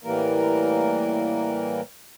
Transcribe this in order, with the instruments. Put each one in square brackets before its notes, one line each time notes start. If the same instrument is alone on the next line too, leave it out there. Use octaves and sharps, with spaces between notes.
[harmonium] A2 E3 G3 A#3 A#4